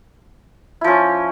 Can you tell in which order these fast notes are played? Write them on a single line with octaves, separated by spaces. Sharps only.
E4 F3 C#4